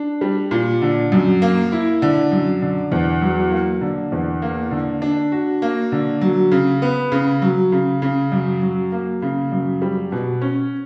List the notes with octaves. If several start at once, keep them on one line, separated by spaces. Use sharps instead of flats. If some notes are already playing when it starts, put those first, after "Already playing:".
Already playing: D4
G3
A#2
D3
F#2
A#3
E4
D3
F#2
D3
E2
F#3
A#3
D3
E2
A#3
D3
D4
F#4
A#3
D3
F#3
C#3
B3
C#3
F#3
C#3
C#3
F#2
F#3
A#3
C#3
F#2
G3
B2
C#4